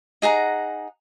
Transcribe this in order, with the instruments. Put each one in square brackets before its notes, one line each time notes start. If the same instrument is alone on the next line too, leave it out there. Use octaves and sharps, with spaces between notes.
[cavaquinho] D#4 G#4 F#5 A#5